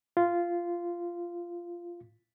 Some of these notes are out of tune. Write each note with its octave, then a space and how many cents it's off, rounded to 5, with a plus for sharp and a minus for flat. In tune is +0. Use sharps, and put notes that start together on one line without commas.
F4 -10